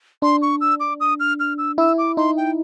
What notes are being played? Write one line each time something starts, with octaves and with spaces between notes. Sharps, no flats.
D4 C6
C#6
E6
D6
D#6
F6
F6
E6
E4 E6
D6
D#4 C6
G5